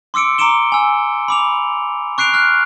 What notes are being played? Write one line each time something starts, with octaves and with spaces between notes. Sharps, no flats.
C6 D6 E6 C#7 D7
A#5 C6 D6 D7 E7 G7
G#5 E6
B5 D6 F7
C#6 F#6 C7 D7 F7
F6 F#6